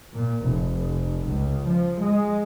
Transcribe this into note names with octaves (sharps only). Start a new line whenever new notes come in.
A#2
F1
C#2
F3
G#3